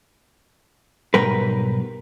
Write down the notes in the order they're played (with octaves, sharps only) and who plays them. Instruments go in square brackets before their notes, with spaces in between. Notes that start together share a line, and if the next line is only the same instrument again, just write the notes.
[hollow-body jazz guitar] B1 G#2 G3 A#4 B4